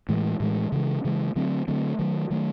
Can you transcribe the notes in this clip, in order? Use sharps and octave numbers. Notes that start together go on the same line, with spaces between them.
A2 E3 G#3
A2 E3 G#3
C#3 E3 G#3
C#3 E3 G#3
D3 F#3 A3 C4
D3 F#3 A3 C4
D#3 F#3 A3
D#3 F#3 A3